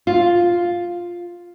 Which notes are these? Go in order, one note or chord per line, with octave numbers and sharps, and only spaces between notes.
F4